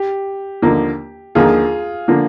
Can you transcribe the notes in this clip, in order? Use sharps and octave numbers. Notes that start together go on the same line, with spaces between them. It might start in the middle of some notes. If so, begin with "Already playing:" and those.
Already playing: G4
D#2 D3 F3 A#3
D#2 D3 F3 A#3 F4 G#4
D3 F3 A#3